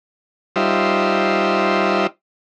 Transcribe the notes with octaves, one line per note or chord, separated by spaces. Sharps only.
G3 D#4 F4 C5 E5